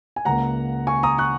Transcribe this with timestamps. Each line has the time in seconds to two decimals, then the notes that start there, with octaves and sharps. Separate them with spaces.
0.16 G#5
0.25 C#2 C#3 A#3 F#5 A#5
0.87 G#5 C#6
1.03 A#5 D#6
1.18 C#6 F#6